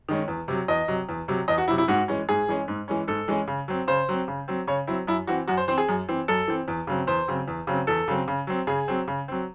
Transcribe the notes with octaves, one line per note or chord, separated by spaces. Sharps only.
D#3 G#3 C#4
E2
C3 F#3
E2 D#5
C3 F#3
E2
C3 F#3
E2 D#5
F#4
C3 F#3 E4
E4
G#2 F#4
E3 G#3 C#4
G#2 G#4
E3 G#3 C#4
G#2
E3 G#3 C#4
G#2 A4
E3 G#3 C#4
C#3
F#3 C4
C#3 C5
F#3 C4
C#3
F#3 C4
C#3 C#5
F#3 C4 E4
F#2 E4
E3 C4 F#4
F#2 F#4
C5
E3 C4 C5
G#4
F#2
E3 C4
F#2 A4
E3 C4
E2
C#3 F#3 C4
E2 C5
C#3 F#3 C4
E2
C#3 F#3 C4
E2 A4
C#3 F#3 C4
C#3
F#3 C4
C#3 G#4
F#3 C4
C#3
F#3 C4